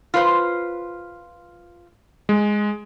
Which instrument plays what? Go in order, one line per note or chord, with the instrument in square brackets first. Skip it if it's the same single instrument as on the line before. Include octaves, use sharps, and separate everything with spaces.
[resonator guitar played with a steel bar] F4 B4 C5
[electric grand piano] G#3